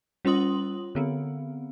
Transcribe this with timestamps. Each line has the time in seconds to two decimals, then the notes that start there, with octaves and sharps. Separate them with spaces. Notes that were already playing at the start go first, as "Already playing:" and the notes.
0.25 G3 C#4 F4 C6 D#6 F#7
0.95 D3 B3 C4